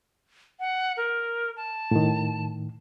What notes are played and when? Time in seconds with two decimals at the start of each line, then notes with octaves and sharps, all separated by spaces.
0.60 F#5
0.97 A#4
1.57 A5
1.91 A2 D#3